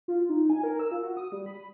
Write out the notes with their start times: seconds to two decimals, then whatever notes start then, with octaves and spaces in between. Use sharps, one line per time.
0.08 F4
0.29 D#4
0.50 G#5
0.63 A#4
0.80 E6
0.91 F4
1.03 F#4
1.17 D#6
1.32 G3
1.46 B5